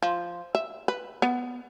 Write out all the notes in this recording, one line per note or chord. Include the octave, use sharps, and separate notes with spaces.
F3
E5
B4
B3